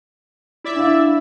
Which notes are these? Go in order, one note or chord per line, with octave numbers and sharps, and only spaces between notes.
E4 D5 E5
D4 F5